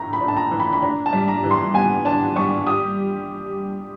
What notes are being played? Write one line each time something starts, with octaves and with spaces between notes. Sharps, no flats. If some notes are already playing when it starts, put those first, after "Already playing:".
Already playing: A2 E3 A3 D4 A#5
B5
D4
A5
A#5
E3
B5
B5
D4 A#5
A5
G3
A#5
E3
C6
B3 G#5
D4 A5
G3 C#6
G4 D#6